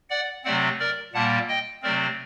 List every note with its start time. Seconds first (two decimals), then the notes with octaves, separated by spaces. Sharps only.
0.10 D5 F#5
0.44 C3 F#3 A3 C4 D5 F#5
0.79 A#4 D5
1.13 A#2 G3 A#3 F#5 A5
1.48 D#5 G5
1.82 C3 F#3 A3 C4 A#4 D5